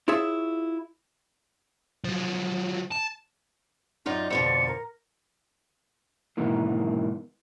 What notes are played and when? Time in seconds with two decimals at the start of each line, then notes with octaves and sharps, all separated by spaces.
0.08 E4 F4 G#4 C#5 E5
2.04 F3 F#3
2.92 A5
4.06 F#2 D#4 F4 D5
4.30 F2 B2 D3 C#7
4.67 A#4
6.37 G#2 B2 D#3 E3 A#3